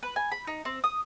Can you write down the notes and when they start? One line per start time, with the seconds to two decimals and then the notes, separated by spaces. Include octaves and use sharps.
0.03 B4
0.16 G#5
0.32 B5
0.47 D#4
0.65 C4
0.84 D#6